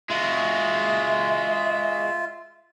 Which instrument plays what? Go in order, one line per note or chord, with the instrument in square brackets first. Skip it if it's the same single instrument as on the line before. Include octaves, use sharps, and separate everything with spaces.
[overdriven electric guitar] G#3 F#4 [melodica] F4 [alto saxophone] E5